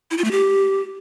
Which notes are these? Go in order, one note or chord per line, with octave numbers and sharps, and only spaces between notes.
E4
F4
A3
G4